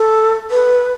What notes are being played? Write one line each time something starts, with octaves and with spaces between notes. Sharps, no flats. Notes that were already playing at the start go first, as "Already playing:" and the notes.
Already playing: A4
B4